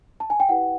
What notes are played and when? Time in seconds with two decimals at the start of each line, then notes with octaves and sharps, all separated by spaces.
0.20 A5
0.30 G#5
0.40 G5
0.49 E4 G4 B4 F#5